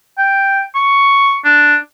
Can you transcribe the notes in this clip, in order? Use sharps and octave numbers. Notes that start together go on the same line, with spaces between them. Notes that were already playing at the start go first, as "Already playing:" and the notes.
G5
C#6
D4